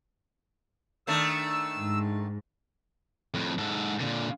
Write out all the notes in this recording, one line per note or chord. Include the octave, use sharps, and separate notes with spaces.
D#3 A3 D4 E6
G#2
F2 A2
G#2 A4
A#2 D3